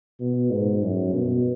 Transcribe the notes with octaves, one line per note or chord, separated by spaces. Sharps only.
B2
G#2
F#2
B2